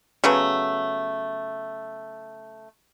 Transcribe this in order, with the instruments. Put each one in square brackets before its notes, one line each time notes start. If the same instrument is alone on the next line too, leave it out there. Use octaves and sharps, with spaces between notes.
[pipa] C#3 F#3 A3 B3